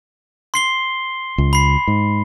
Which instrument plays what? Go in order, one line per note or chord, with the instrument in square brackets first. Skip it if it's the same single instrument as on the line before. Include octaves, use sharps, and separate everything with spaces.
[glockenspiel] C6 C7 G7
[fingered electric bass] C#2
[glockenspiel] B5 C7
[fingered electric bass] G#2